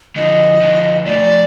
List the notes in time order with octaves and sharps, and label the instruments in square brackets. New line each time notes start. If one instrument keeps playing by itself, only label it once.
[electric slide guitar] D3 F3 [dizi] D#5
[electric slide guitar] D3 F3
[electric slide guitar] F3 A3 [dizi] D5